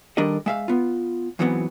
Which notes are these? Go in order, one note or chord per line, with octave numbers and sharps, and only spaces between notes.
D#3 G3 D4 A4 A#4 D#5
G#3 E5 F5
B3 F4
E2 G#2 E3 F#3 B3 C4